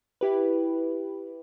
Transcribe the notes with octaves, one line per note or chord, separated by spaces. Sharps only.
E4 G4 B4